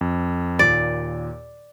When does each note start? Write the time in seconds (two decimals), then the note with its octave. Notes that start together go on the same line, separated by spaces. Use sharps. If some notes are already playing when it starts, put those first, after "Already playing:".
0.01 F2
0.59 D#2 A#2 D5